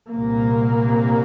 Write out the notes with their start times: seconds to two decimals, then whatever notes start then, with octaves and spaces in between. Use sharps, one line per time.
0.11 C2 A#2 A#3